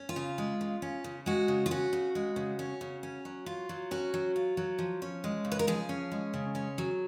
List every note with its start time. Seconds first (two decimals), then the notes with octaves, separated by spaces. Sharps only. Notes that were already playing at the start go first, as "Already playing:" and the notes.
Already playing: C#4
0.09 F4
0.16 C#3
0.38 G#3
0.61 C#3
0.82 C#4
1.04 C#3
1.26 G#3 F#4
1.48 C#3
1.66 F4
1.71 C#4 F#4
1.93 C#3
2.15 G#3
2.36 C#3
2.59 C#4
2.81 C#3
3.03 C#4
3.25 F#3
3.46 F4
3.69 F#3
3.91 C#4 F#4
4.14 F#3
4.36 F4
4.57 F#3
4.79 F3
5.02 C#4
5.24 G#3
5.45 C#3
5.52 B4
5.59 A#4
5.67 F3 G#4
5.89 C#4
6.12 G#3
6.34 C#3
6.55 C#4
6.78 F#3